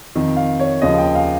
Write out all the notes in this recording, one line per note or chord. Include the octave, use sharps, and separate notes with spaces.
F2 D#3
F5
C#5
D#2 C#3 F3 D#5
G5
F5